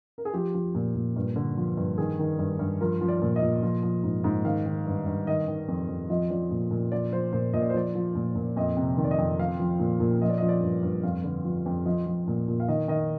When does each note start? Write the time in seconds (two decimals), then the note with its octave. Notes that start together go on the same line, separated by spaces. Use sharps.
0.18 A#4
0.25 G#4
0.34 F3 G4
0.54 F3
0.75 A#2
0.95 A#2
1.16 G2
1.36 D3
1.57 F3
1.77 G2
1.98 D#3 G#4
2.19 D#3
2.39 G2
2.59 G2
2.81 F3 A#4
3.01 F3
3.08 D5
3.22 A#2
3.36 D#5
3.42 A#2
3.63 F3
3.83 F3
4.03 G#2
4.24 G#2
4.45 D#3 F5
4.66 D#3
4.86 G2
5.06 G2
5.27 D#3 D#5
5.48 D#3
5.68 F2
5.88 F2
6.10 F3 D#5
6.30 F3 D5
6.51 A#2
6.71 A#2
6.92 F3 D5
7.13 F3 C5
7.33 A#2 C5
7.53 A#2 D#5
7.62 D5
7.70 C5
7.74 F3 D5
7.95 F3
8.15 A#2
8.35 A#2
8.56 F2 D#5
8.77 C3
8.97 D#3
9.04 D5
9.11 D#5
9.18 F2
9.39 F3 F5
9.59 F3
9.79 A#2
10.00 A#2
10.22 F3 D#5
10.29 D5
10.38 D#5
10.42 F3
10.49 D5
10.62 G2
10.83 G2
11.03 F2 F5
11.24 D3
11.45 F3
11.66 F2
11.85 F3 D#5
12.06 F3
12.28 A#2
12.48 A#2
12.60 F5
12.68 D#3 D#5
12.88 D#3 D#5